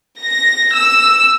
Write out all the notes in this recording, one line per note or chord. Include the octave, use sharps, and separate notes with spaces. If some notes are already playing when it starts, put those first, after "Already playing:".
A#6
E6